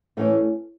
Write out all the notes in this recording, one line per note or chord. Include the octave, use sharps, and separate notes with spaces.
A2 E3 A3 C#4